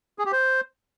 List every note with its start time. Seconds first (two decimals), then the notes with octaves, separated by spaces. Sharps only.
0.19 G#4
0.25 G4
0.32 C5